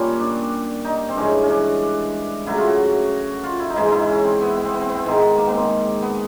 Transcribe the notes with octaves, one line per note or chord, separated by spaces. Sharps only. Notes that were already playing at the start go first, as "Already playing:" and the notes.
Already playing: A#2 G3 C#4
D4
D#4
C4
G2 E3 G#3 C#4
C#4
D4
C#3 F#3 A3 E4
F4
F#4
F4
E4
D#4
G#2 E3 G#3 E4
D#4
E4
C#4
C4
B3
B3
C4
B3
C4
B3
C4
G#2 D#3 G#3 B3
A#3
B3
C4
B3